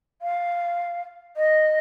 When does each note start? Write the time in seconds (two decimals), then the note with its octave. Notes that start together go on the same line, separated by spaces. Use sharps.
0.22 F5
1.37 D#5